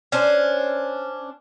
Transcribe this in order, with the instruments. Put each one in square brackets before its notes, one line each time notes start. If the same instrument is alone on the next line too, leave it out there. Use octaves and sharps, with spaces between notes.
[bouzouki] C#4 D4 C5